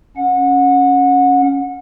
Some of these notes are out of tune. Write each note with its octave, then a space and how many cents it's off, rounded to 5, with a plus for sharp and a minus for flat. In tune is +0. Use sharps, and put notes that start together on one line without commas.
C#4 +0 F#5 -25